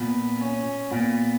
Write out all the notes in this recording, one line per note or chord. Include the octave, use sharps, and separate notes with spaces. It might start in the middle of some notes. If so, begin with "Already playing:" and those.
Already playing: A#2 B3
C#4
A#2 B3